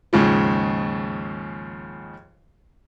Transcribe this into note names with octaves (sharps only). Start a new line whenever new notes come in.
D#2 G#2 C#3 F3